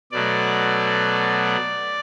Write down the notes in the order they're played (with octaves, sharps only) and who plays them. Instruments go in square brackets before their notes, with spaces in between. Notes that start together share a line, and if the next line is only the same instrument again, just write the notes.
[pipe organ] B2 F#3 A3 D5